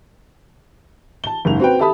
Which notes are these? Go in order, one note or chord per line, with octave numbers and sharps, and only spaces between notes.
A5 G7
F#1 G#2 F7
C4 F#4 B4 G5
G4 A4 E5 A5 B5 D#6